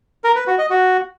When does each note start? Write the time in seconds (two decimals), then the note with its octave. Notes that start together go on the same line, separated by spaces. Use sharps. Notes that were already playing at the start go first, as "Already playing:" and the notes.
0.24 A#4
0.36 B4
0.47 F#4
0.58 D#5
0.70 F#4